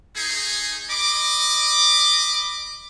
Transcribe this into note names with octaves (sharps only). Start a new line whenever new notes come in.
A3 D#4 G#4
D#5 B5 D6